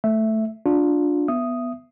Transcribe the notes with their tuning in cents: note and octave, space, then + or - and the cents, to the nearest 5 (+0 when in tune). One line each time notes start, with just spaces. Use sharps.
A3 +0 E5 +0
D4 +0 F4 +30
B3 +0 E5 +20 D#6 +0